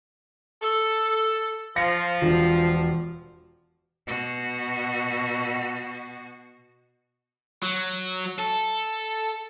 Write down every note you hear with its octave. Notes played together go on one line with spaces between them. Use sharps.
A4
F3 F5 A#6 C#7
E1 F4
B2 F#4
F#3
A4